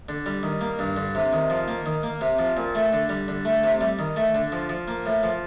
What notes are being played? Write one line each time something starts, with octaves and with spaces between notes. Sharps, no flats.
D3
G3
D#3
A#3
G2
D3
C3
D#3
F3
A#3
D#3
A#3
C3
F3
A#2
A3
D3
G3
D3
A3
C3
G3
D#3
A3
D3
F3
F3
A#3
A2
F3